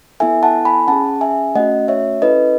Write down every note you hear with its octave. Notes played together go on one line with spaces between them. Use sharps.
B3 E4 A4 E5 G#5
F#5 A5
G#5 B5
C#4 G#4 F#5 A5
E5 G#5
A3 C#4 F#4 D#5 F#5
C#5 E5
C#4 E4 A4 B4 D#5